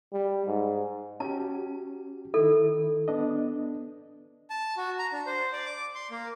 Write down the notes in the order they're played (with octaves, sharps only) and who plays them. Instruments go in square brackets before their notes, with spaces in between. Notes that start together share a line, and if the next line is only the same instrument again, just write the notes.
[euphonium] G3
G#2
[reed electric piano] C#4 F#4 G4 [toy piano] A5
[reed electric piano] D#3 E4 [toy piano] A4
[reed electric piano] B3 D4 D#5
[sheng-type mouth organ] A5
F#4
A#5
D4
C5
D5
D6
C6
A#3